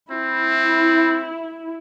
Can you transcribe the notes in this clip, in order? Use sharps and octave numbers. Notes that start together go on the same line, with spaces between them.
C4 E4